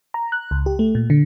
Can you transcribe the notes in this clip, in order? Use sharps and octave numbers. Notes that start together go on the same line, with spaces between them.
A#5
F#6
C#2
G4
A3
A#2
D3